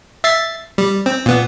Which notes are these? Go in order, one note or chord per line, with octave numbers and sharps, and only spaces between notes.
E5 A6 C7
G3
C4
A#2 B3